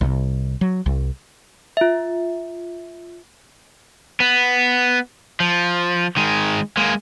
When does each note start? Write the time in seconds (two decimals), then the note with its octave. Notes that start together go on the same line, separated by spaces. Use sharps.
0.01 C2
0.61 F#3
0.86 C2
1.77 F4 E5
4.20 B3
5.40 F3
6.17 D#3 G#3
6.77 G#3 A#3